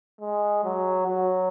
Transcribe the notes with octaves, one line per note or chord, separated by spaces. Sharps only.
G#3
F#3
F#3